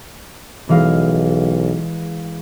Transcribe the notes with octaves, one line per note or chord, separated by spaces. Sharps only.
B1 E3 G#3 F5